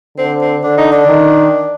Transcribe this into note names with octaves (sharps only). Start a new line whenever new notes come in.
D3 C4
C4
D3 D4
D#4
D4
D#3